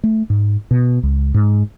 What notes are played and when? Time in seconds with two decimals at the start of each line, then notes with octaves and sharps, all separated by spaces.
0.04 A3
0.30 G#2
0.71 B2
1.03 C#2
1.34 G#2